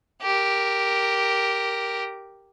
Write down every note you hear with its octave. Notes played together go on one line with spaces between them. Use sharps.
G4 A#4